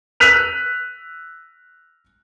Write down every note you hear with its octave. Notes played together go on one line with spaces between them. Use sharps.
E6 F#6 B6 D#7 F7